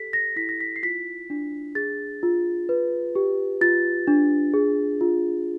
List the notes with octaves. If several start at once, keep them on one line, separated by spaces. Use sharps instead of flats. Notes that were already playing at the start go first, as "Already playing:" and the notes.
Already playing: G4 A4 B6
A#6
E4 B6
A#6
B6
C7
F4 B6
D4
G#4 A6
F4
B4
G4
F4 A6
D4
G#4
F4